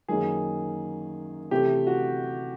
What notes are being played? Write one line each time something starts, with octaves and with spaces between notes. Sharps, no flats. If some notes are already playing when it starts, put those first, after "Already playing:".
F#2 D#3 F#3 A#3 G#4
C3 E3 A3 C4 G4
F#4